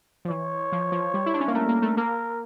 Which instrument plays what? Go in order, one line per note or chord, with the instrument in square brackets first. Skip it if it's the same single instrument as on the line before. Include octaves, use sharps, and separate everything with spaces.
[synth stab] F3
[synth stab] E3 [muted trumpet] C#5
[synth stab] F3
F3
G3
E4
D4
C#4
A#3
[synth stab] A3 [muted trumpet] A#4
[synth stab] A#3
A3
[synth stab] A#3 [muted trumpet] A#4